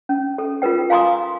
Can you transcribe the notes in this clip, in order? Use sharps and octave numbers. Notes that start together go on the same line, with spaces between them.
C#4
A4
F4 G#4 A#4 B4 G5
F5 G#5 A#5 C6 D6 D#6